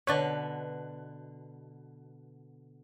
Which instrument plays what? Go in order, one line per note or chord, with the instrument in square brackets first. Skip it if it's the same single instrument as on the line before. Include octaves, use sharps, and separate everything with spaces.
[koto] B2 D3 B4 [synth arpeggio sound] C#5 D5